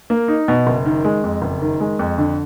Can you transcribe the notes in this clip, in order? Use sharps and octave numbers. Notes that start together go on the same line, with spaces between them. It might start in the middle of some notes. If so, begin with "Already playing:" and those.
A#3
D#4
B2
F#1
D#3
G#3
F2
F#1
D#3
G#3
F2
D3